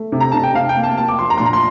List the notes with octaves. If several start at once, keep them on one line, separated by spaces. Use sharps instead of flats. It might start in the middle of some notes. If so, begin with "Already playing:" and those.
Already playing: A3
C3
A#5
C3 A5
G5
C3 F5
G5
A#3
A5
A#3 A5
D6
F3 C6
A#5
A#2 C6
A#5
C6